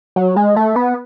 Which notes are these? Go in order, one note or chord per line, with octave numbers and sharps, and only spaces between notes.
F#3
G#3
A3
B3